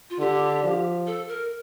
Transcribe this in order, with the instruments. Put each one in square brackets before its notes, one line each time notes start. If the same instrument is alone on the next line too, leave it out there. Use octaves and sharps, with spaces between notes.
[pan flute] F4
[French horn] D3 [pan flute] G4
[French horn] F3
[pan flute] A4
A#4